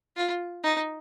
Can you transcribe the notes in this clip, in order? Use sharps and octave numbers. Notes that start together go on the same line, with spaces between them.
F4
D#4